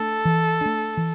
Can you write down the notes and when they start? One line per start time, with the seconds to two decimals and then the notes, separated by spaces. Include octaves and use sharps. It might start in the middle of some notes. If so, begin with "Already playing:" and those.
Already playing: A3 D4 A4
0.25 E3
0.61 A3 D4
0.97 E3